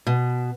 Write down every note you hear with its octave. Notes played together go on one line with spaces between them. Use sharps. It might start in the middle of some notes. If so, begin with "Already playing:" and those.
B2